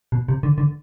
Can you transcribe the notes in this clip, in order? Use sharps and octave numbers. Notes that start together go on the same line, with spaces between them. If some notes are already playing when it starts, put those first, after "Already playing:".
B2
C3
D3
D3